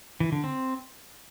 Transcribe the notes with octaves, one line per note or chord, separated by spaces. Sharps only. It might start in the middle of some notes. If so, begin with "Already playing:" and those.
E3
D3
C4